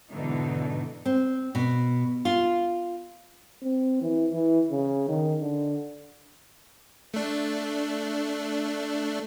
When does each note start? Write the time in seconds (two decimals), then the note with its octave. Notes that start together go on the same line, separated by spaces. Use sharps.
0.10 G#2 B2 D3 E3 D#4
1.06 C4
1.55 B2
2.25 F4
3.62 C4
4.02 E3
4.33 E3
4.71 C#3
5.08 D#3
5.41 D3
7.14 A3 D4